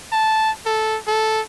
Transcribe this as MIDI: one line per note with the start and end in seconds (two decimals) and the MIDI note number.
0.12 0.51 81
0.66 0.98 69
1.08 1.41 69